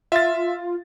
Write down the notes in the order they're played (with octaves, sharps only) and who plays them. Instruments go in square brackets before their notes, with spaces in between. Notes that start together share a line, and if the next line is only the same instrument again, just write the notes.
[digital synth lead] F4 [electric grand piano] E5 A6